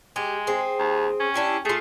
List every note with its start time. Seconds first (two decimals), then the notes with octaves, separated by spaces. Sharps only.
0.16 G#3 G4
0.47 C4 G#4
0.79 D#2
1.20 C#4
1.34 D4 E4 G4
1.65 A3 F4 G#4